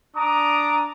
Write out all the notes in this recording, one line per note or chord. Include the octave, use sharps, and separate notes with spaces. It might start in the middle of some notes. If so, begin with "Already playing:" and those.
D4 A#5 D6 D#6